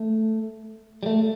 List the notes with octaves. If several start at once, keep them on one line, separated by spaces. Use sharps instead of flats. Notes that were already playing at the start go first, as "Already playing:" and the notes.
Already playing: A3
G3
A3